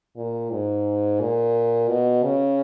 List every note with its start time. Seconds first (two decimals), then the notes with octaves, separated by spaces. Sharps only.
0.16 A#2
0.51 G#2
1.20 A#2
1.89 B2
2.24 C#3